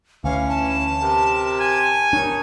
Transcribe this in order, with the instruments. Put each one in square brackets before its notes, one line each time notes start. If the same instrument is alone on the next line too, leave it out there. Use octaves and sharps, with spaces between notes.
[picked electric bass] D2 [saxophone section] E3 C#4 [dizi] F5
[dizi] A5
[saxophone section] C3 G4 A#4
[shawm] G#5
[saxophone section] D#3 C#5 [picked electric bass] D4